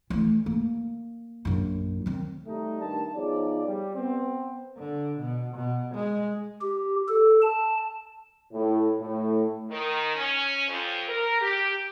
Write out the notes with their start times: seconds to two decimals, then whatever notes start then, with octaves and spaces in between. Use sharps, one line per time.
0.10 E3 A3
0.46 A#3
1.45 A#1 F#2
2.06 D#3 C4
2.47 G3 A3 D#4
2.82 G2 D#3 A5
3.16 F3 B3 D#4 G#4 C#5 D5
3.66 G3
3.95 B3 C4
4.77 D3
5.19 B2
5.55 B2
5.94 G#3
6.62 G4
7.09 A4
7.42 A5
8.53 A2
9.01 A2
9.70 D#3
10.15 C#4
10.68 F2
11.08 A#4
11.41 G4